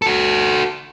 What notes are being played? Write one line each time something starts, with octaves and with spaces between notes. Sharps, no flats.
F#4 A4